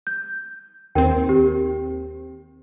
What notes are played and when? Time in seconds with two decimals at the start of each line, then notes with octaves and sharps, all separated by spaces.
0.07 G6
0.95 D#2 C4 A#4 G5
1.29 G4